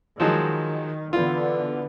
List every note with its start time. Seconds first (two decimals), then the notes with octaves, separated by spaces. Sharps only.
0.20 D#3 F3 F#3 G#3
1.13 D3 E3 B3 F4